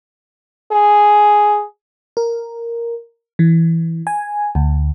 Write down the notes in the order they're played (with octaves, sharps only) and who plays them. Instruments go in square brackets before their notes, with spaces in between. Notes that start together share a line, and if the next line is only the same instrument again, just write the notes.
[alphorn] G#4
[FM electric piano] A#4
E3
G#5
D2